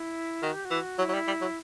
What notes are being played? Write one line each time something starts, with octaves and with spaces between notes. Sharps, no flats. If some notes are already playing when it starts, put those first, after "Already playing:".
Already playing: E4
D#3 F#4
G4
F#4
E3
F#3 E4
F#3
G3
G3
F#3